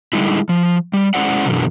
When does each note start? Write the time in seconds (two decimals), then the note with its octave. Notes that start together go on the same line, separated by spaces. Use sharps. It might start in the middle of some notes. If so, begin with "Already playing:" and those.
0.13 D3 G3 G#3 D#4 E4
0.49 F3
0.94 G3
1.14 G#3 C#4 E4 C5 D5 F#5
1.46 F#2 B2 D3 E3 F#3